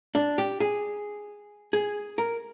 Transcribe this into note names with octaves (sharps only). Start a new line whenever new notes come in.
D4
G4
G#4
G#4
A#4